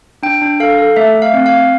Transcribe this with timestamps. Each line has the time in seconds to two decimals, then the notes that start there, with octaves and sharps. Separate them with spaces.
0.23 D4 G5
0.42 D4
0.60 A4 F5
0.78 A4
0.96 A3 E5
1.15 A3
1.22 F5
1.34 C4
1.46 F5
1.52 C4